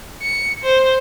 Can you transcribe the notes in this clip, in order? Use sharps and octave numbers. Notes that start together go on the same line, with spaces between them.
C#7
C5